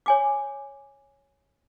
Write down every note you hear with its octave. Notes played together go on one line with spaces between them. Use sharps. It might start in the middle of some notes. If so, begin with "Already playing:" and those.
C#5 G#5 D6